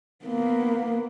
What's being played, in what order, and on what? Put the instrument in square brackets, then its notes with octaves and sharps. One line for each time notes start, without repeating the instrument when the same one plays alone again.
[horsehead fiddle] A#3 B3